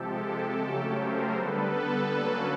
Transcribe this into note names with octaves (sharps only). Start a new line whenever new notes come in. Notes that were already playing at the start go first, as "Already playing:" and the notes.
Already playing: C3 F3 G#3 G4 A4
G4 A4
C#3 F#3 A3 C#4
A#4 C5
D3 G3 B3 A4 B4
A4 B4
D3 F#3 A#3 C#4